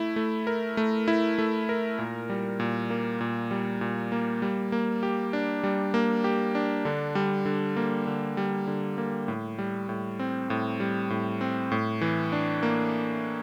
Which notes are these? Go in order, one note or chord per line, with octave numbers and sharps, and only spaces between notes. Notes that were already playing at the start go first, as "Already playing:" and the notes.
Already playing: A3 E4
A3
A#4
A3
E4
A3
A#4
A#2
G3
A#2
A#3
A#2
G3
A#2
A#3
G3
A#3
G4
D4
G3
A#3
G4
D4
D3
G3
D3
A#3
D3
G3
D3
A#3
A2
G3
A2
C4
A2
G3
A2
C4
A2
E3
D4
A#3